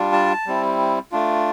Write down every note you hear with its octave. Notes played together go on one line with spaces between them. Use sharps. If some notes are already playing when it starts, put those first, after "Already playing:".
Already playing: G3 D4 F4
A5
G3 C4 E4
A3 D4 F4